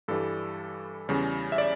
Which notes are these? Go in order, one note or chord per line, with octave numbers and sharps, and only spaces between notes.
G2 E3 G3 A4
E2 C#3 G3
E5
D5